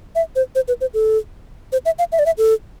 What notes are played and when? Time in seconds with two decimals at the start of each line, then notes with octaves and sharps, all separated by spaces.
0.15 E5
0.36 C5
0.55 C5
0.68 B4
0.81 C5
0.94 A4
1.72 C5
1.85 E5
1.99 F5
2.12 E5
2.19 D5
2.26 E5
2.38 A4